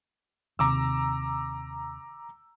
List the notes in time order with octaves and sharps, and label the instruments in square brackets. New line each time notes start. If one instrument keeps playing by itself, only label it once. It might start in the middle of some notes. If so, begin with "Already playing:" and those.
[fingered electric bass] D#2 C3 [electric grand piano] A#5 D6 E6